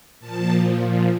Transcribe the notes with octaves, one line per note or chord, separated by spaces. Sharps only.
A#2 F3 A5